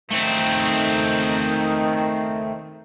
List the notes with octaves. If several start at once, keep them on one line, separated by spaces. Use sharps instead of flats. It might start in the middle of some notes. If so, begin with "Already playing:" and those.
D#3 A3 C4